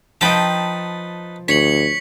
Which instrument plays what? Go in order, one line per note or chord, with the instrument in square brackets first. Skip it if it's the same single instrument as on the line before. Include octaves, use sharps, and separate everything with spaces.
[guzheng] F3 G5 B5 [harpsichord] D#4 B4 A5
[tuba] D2 [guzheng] C#5 [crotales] B6 C#7 F#7